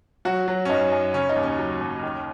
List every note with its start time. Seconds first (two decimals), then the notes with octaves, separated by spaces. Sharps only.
0.25 F#3 F#4
0.48 F#3
0.65 C#4
0.69 F#2 D#4
0.92 F#2
1.14 C#3 C#4
1.29 D#4
1.36 D#2
1.43 C#4
1.58 F#3
1.81 D#2
2.03 D#3